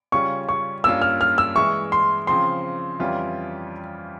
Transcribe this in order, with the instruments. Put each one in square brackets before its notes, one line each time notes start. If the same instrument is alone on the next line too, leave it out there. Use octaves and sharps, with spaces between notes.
[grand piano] C#3 G3 C#4 F4 [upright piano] C#6
[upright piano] C#6
[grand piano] G2 G3 A#3 C#4 F4 [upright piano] E6
[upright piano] F6
F6
E6
[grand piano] E3 G#3 E4 [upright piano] C#6
[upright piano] C6
[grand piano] C#3 F3 C4 [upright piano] C6
[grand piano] F2 E3 G3 C#4 F4